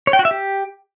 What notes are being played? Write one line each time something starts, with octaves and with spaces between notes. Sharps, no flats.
C#5
G5
F#4
E5
G4